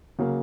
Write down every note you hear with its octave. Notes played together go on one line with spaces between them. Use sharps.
C#3 F#3 A#3